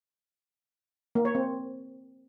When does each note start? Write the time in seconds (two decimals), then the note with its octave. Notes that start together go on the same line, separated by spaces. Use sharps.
1.15 A#3
1.25 C#5
1.35 C4